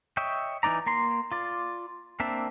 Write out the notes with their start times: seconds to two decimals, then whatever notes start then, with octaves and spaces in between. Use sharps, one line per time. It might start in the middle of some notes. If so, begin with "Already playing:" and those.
0.17 C#5 D#5 E5 G5
0.63 E3 C#4 D#4 D5 A#5
0.86 A#3 A#5 C6
1.32 F4 D5
2.20 A#3 C4 D4 E5